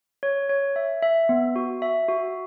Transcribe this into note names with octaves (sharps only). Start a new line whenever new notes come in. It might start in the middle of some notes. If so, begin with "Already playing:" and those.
C#5
C#5
E5
E5
B3
F#4
E5
F#4